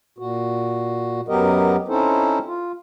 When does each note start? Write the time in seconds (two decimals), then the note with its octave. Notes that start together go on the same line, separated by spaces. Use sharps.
0.18 A#2 F#4
1.28 F#2 F#3 B3 G4 A#4 D#5
1.88 C4 C#4 D#4 E4 A4 C5
2.46 F4